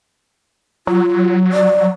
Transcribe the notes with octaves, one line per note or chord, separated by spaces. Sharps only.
F#3 F4
D5